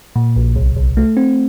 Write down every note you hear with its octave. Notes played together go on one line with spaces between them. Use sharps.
A#2
A#1
C2
C2
A3
C4